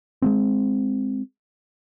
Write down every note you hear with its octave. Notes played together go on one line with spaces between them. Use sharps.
G#3 A3 C4